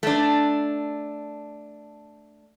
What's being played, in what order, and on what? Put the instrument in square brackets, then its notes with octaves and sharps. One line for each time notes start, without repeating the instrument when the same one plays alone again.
[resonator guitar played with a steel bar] A3 D4